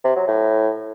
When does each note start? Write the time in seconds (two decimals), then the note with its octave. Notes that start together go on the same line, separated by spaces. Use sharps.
0.04 C3
0.16 F#3
0.28 A2